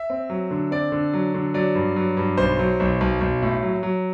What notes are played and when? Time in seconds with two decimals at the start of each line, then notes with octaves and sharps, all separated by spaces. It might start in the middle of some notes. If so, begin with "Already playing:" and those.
Already playing: E5
0.10 C4
0.30 F#3
0.51 D3
0.71 C4 D5
0.92 D3
1.13 F#3
1.34 D3
1.54 F#3 D5
1.75 G2
1.96 F#3
2.17 G2
2.37 B1 C5
2.59 F#3
2.80 B1
3.01 B1
3.21 B1
3.42 A2
3.63 F#3
3.83 F#3